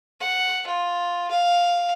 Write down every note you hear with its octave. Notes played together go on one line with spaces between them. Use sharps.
F#5
F4
F5